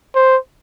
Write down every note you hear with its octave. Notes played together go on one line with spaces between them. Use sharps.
C5